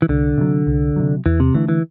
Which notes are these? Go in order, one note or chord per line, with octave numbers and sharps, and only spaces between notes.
E3
C2 D3
C3 F#3
C2
C3 F#3
E2 E3
C3
D3 E3 A3 D4
E3